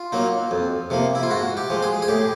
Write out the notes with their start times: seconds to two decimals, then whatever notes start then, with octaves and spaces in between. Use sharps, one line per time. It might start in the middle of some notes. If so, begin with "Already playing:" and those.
Already playing: F4
0.12 F#3 A#3 D#4
0.51 F2
0.90 C3 F3 A#3
1.15 E4
1.23 F4
1.30 G#2 F#4
1.57 G4
1.70 F3 G#3
1.82 G#4
2.02 G#4
2.08 A2 G4